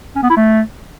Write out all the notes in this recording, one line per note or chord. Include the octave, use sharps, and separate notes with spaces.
C#4
B3
E4
A3